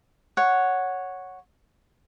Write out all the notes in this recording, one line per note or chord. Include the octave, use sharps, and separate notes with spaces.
C#5 F#5